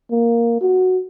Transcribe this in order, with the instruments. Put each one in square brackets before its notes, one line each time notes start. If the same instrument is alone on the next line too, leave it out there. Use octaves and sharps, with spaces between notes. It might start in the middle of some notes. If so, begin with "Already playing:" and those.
[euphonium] A#3
F#4